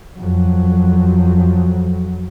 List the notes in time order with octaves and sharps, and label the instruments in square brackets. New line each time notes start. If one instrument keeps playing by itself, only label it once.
[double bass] F2 F#3